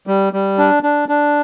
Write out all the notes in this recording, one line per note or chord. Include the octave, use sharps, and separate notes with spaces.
G3
G3
D4
D4
D4